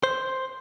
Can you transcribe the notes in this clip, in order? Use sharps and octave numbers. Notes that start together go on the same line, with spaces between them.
C5